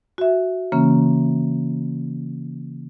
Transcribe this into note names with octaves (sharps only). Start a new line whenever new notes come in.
F#4 E5
C#3 E3 A#3 C#4